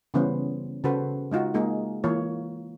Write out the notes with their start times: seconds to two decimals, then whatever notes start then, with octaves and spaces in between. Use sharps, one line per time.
0.14 C#3 E3 G3 B3 C#4 C5
0.84 C#3 F#4 A4 B4 C5
1.32 G#3 D#4 F4 F#4
1.54 G#3 A#3 D#4 G#4
2.04 E3 A#3 F4 C#5